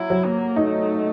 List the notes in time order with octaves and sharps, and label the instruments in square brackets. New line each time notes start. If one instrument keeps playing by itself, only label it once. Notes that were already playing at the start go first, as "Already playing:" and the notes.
Already playing: [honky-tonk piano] F#3 [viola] E4
[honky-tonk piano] F#3
[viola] A#3
[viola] A3 [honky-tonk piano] D#4